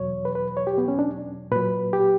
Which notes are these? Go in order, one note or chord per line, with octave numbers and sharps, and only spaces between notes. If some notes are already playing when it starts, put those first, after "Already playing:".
Already playing: E2 B2 F#3 C#5
B4
B4
C#5
G4
B3
C#4
D4
A#2 F#3 B4
G4